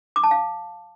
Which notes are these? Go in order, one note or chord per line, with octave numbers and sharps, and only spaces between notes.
D6
A5
F5